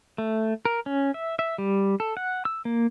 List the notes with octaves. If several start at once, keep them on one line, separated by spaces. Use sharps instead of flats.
A3
A#4
C#4
E5
E5
G3
A4
F#5
E6
A#3